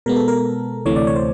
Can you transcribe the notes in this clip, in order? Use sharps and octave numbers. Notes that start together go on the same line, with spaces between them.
B2 G#3 B3 A#4
A4
A#4
D2 C3 E3 A3 C#5
D5
C#5
C5